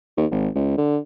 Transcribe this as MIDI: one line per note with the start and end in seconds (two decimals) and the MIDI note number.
0.17 0.26 39
0.31 0.48 32
0.55 0.73 37
0.77 0.98 50